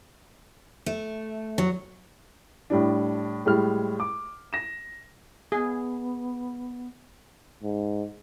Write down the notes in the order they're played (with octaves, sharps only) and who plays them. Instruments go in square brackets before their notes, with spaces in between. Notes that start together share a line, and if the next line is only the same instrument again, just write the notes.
[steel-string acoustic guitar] A3
F#3
[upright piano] A2 G3 D4
A2 G3 G#3 F6
D6
A#6 E7
[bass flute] B3 [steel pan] G#4
[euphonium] G#2